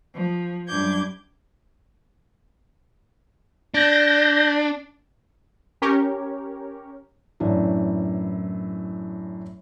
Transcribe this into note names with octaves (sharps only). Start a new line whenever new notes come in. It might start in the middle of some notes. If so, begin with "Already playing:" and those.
F3
F#2 G3 D4 D6 G6 G#6
D4 G6 A#6
C#4 G4 A#4 C#5
F#2 A2 E3 D4 E4